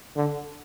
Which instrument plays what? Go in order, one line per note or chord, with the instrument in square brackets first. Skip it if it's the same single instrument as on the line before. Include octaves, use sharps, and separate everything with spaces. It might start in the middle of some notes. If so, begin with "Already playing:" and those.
[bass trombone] D3